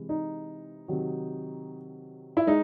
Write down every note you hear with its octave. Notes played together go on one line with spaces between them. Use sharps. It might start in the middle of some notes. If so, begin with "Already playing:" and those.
Already playing: C3 E3 G#3
D#4
C3 D#3 F#3
E4
G#3 D#4